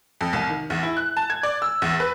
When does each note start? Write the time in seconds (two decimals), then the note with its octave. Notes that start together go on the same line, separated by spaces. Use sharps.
0.21 F2
0.33 C2
0.50 D#3
0.70 E2
0.83 E4
0.97 F#6
1.17 A5
1.30 G#6
1.43 D5
1.62 E6
1.82 E2
2.00 B4